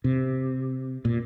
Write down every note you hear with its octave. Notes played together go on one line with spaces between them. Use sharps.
C3
A#2